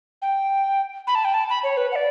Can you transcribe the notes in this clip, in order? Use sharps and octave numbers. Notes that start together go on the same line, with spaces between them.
G5
B5
A5
G5
A5
B5
C#5
B4
F#5
D5